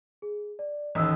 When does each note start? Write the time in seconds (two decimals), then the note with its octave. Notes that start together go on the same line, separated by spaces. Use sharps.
0.22 G#4
0.59 D5
0.95 A1 D#2 D#5 D#6 E6